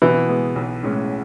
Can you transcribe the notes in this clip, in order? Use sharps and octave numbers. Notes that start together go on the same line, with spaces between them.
B2 E3
G#3 B3
B1
A2 G#3 C#4